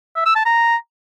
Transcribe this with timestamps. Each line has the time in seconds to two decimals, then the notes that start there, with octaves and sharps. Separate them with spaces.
0.16 E5
0.26 E6
0.36 A5
0.46 A#5